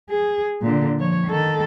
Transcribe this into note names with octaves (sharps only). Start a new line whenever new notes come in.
G#4
A#2 D3
F3 C#5
D#3 A4